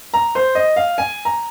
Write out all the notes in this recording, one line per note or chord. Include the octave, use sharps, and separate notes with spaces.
A#5
C5
D#5
F5
G#5
A#5